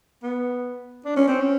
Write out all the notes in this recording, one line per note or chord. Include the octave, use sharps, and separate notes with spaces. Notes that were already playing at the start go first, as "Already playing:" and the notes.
B3
D4
C#4
C4
C#4